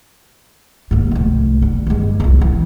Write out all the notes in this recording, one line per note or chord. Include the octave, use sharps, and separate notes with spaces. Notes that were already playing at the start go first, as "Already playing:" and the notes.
D#2 G#2
C2 A2
D3
G2 G#3
C2 F2
A1 E3